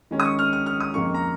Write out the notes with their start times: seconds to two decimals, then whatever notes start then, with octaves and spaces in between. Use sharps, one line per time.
0.11 D#3 G#3 C#4
0.20 D#6
0.25 C#6
0.39 F6
0.53 F6
0.66 F6
0.80 D#6
0.94 F2 C#3 A#3 D#4 C#6
1.14 A#5